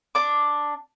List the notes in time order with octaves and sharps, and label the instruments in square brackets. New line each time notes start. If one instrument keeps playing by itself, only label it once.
[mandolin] D4 D6